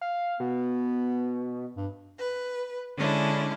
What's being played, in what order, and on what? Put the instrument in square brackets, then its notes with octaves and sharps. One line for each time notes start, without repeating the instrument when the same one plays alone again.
[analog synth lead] F5
[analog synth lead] B2 [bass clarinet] B3
[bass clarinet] G2
[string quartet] B4
D3 G#3 C#4 D4 E4